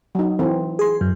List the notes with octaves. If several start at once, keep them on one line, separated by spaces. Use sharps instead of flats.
F#3 D#4
E3 C4
G#4 C6
F#2